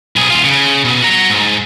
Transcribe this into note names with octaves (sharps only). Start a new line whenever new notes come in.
B1 G#4
D#2 F4
C#3
B2
F#4 A#5
G#2